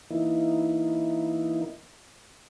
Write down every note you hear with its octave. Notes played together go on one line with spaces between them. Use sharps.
E3 A#3 D#4 E4